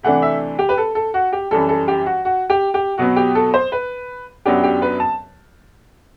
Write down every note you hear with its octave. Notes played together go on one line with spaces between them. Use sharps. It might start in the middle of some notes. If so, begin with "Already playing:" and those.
C3 E3 A3 D4 F#5
E5
G4
B4
A4
A4
F#4
G4
F#2 E3 G3 A4
A4
G4
F#4
F#4
G4
G4
B2 F#3 B3 F#4
G4
A4
C5
B4
F#2 F#3 B3 D4 G4
G4
B4
A5